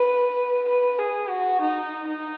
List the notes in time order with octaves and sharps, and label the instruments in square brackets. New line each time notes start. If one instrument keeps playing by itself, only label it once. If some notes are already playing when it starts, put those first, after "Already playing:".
Already playing: [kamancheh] B4
B4
G#4
F#4
D#4
D#4